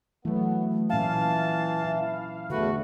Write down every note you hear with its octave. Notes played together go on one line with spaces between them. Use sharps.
E3 F#3 A3 B3
A#2 E3 C#4 E5 F5 A5
E4
E2 D3 A3 F#4 B4